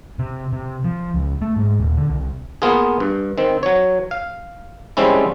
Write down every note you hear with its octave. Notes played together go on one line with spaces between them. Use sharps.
C3
C3
F3
C#2
A3
G#2
D#1
D3
C2
A#3 B3 F4 G#4
G2
D#3 C4
F#3 C#5
F5
F3 G3 G#3 C4 C#4 E4